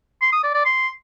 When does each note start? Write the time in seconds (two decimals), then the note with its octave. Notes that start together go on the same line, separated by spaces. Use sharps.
0.21 C6
0.32 D#6
0.43 D5
0.54 D5
0.65 C6